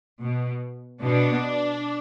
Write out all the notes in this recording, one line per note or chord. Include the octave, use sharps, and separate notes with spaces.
B2
B2 D4